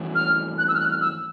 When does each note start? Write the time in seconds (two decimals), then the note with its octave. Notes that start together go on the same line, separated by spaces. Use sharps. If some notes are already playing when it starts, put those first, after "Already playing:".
Already playing: G2 E3 A3 C#4 F#4
0.15 F6
0.58 F#6
0.68 E6
0.74 F6
0.80 F#6
0.90 F6
1.01 E6